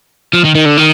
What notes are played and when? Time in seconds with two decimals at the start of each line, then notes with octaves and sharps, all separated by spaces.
0.33 F3
0.45 D#3
0.55 D#3
0.66 D3
0.78 D#3